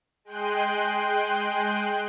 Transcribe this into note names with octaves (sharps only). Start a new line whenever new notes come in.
G#3 G5 C6 F#6 D#7